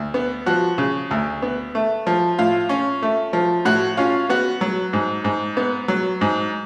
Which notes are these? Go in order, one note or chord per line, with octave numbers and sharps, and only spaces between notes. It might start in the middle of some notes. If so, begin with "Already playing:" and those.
Already playing: D2
B3
F3 F#4
C#3
D2
B3
A3
F3
A2 F4
C#4
A3
F3
A2 F#4
C#4 F4
B3 F#4
F#3
G#2
G#2
B3
F#3
G#2